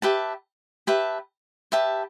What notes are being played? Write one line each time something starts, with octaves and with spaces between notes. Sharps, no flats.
G4 B4 E5 A5
G4 B4 E5 A5
G4 B4 E5 A5